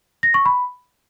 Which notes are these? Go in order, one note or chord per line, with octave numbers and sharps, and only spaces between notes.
A#6
C#6
B5